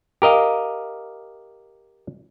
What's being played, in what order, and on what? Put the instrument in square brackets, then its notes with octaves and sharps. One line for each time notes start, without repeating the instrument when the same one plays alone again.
[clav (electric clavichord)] G4 A#4 D#5 F5